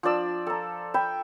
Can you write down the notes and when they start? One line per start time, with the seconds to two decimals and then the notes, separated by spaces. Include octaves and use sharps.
0.03 F3 D4 D5 E6
0.47 A4 A#5
0.94 E5 G5 B5